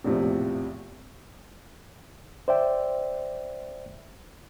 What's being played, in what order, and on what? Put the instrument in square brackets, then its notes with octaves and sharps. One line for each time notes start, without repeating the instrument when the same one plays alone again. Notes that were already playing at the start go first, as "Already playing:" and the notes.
[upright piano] A#1 E2 A2 C3 F3
[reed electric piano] C5 D5 E5 G5